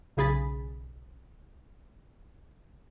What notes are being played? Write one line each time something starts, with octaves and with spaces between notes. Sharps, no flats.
B1 C#3 G#4 B5 A6